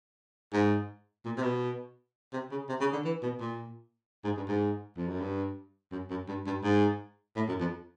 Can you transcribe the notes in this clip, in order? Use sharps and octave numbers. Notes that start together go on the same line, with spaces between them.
G#2
A#2
C3
B2
C3
C#3
C3
C#3
D3
E3
B2
A#2
G#2
G2
G#2
F2
F#2
G2
F#2
F#2
G2
G2
G#2
A2
F#2
F2